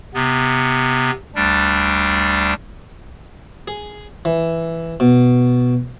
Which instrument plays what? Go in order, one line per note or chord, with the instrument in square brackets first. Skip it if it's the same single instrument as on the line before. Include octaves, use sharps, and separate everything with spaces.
[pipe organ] C3 B3
D2 G3 D4
[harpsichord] G#4
E3
B2